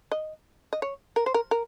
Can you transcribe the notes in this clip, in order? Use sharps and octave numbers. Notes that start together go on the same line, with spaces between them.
D#5
D#5
C#5
A#4
C5
A#4
A#4